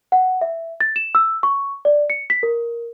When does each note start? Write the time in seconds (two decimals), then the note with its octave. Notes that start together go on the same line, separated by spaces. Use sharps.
0.12 F#5
0.41 E5
0.80 A6
0.96 E7
1.15 E6
1.43 C#6
1.85 D5
2.10 C#7
2.30 B6
2.43 A#4